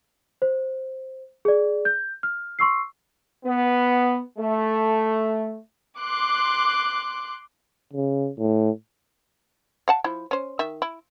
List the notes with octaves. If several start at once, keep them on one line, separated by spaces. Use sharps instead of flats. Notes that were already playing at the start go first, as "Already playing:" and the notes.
C5
G#4 D5
G6
F6
C6 C#6 E6 C7
B3
A3
C6 D6 F#6
C#3
A2
F5 F#5 A5
F3 E4
C#4 C5
D#3 E5
E4